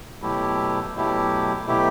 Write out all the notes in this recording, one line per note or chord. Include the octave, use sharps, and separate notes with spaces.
B2 F#3 A3 E4 G4
B2 F#3 A3 E4 G4
B2 F#3 A3 E4 G4